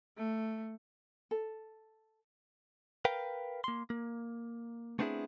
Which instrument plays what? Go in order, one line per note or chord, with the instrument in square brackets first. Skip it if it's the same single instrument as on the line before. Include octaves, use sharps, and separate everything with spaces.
[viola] A3
[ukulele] A4
[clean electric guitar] A#4 B4 F5 G5
A#3 C6
A#3
A3 B3 C4 D4 E4 G#4